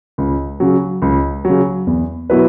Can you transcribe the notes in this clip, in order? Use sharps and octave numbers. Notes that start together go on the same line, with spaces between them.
C#2
C#3 F#3
C#2
C#3 F#3
E2
B2 F#3 E4 B4